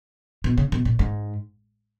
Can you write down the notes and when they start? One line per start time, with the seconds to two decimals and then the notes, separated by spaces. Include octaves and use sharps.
0.44 B2
0.58 C#3
0.72 B2
0.85 A#2
0.99 G#2